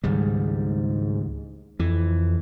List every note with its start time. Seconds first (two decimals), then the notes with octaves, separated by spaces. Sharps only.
0.04 C#2 G#2 D#3 G3
1.80 F2 E3